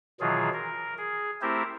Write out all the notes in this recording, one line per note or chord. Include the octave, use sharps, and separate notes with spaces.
B2 D#3 E3 F#3 F4 G#4
A#4
G#4
A3 C4 E4 G4 A#4 C5